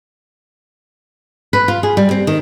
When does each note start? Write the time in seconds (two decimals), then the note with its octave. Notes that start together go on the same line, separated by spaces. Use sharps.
1.53 B4
1.68 F4
1.83 G#4
1.97 G3
2.11 C4
2.27 D#3